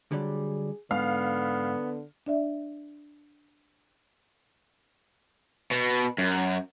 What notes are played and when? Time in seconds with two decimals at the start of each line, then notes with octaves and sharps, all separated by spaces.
0.12 D3 F#3 G3 G#4
0.91 G#2 D3 B3 F5
2.26 D4 D5 E5
5.71 B2
6.18 F#2